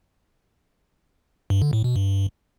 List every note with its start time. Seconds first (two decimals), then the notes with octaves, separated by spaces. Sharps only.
1.50 G2
1.62 D3
1.73 A2
1.84 B2
1.96 G2